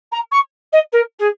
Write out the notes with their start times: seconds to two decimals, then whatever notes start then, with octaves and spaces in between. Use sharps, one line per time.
0.11 A#5
0.31 C#6
0.72 D#5
0.92 A#4
1.19 G#4